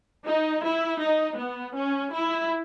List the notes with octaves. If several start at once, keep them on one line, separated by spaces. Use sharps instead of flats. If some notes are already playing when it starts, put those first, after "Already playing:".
D#4
E4
D#4
B3
C#4
E4